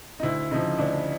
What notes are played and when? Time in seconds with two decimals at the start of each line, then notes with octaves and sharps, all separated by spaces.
0.20 D#4
0.23 D2 E4
0.51 C#3 F3 D#4
0.79 D2 D4